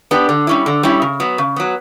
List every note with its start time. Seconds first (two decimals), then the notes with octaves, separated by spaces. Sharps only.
0.11 B3 D4 G4
0.29 D3
0.47 G3 C#4 E4
0.66 D3
0.83 G3 C#4 E4
1.02 C#3
1.20 F#3 B3
1.38 C#3
1.56 F#3 B3